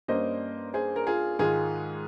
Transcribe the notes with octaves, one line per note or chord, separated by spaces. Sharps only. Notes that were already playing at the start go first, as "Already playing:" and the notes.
G2 G3 A#3 C#4 C5 D#5
G#4 C5
A#4
F4 G#4
G#2 D#3 G#3 F4 G#4